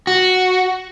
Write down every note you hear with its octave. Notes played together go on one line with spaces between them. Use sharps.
F#4